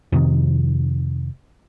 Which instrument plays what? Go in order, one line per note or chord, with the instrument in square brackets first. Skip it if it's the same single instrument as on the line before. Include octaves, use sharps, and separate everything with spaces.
[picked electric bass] F2 C3 D#3